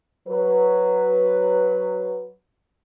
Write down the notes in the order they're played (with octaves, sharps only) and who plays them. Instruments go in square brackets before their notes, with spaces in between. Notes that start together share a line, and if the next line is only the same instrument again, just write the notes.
[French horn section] F#3 B4